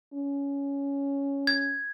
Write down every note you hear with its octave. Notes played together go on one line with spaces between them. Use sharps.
C#4
G#6